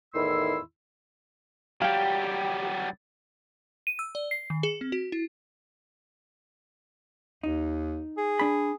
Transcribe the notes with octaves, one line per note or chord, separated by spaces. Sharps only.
E2 A2 D#3 E4 C6 E6
F#3 G3 G4 F5 G5
D#7
E6
D5
C7
D#3
G#4
C4
F#4
E4
D#2 D#4
G#4
D4 B5